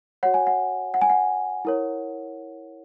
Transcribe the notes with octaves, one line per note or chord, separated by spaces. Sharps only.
F#4 C#5 F#5
G#5
F#5
F#5
G#5
F#5
E4 A#4 C#5